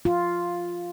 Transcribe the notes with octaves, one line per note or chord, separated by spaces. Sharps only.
F4